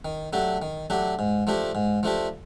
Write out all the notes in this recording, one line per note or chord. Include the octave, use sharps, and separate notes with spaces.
D#3
F#3 A3 D4 G4
D#3
F#3 A3 D4 G4
G#2
F3 A3 D4 G4
G#2
F3 A3 D4 G4